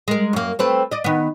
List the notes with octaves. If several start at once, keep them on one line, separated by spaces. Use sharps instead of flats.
G#3 A#4
F#2 A#3
A3 C4 B4
D5 D#5
D#3 B3